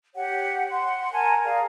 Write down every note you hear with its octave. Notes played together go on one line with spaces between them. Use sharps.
G4 C#5 F#5 G5
F#5 C6
A#4 G#5 A5
G#4 A#4 D5 F5